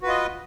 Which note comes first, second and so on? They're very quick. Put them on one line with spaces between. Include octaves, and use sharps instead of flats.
F#4 B4 F4 D#5